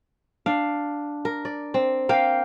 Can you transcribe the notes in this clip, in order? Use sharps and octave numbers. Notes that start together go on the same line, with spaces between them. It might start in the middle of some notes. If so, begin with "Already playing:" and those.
D4 F5
A#4
D5
C4
A#3 F5 G5